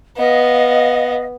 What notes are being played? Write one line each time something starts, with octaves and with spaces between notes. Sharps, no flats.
B3 D#5 F5